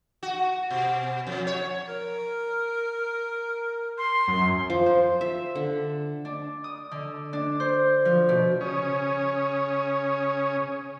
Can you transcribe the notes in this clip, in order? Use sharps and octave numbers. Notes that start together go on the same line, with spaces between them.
F#4
B2
F2
C#5
A#4
C6
F#2
F3
C5
E5
D3
D4
D#6
D3
D4
C5
F3
B2
C#3 C#4 C#5 D#6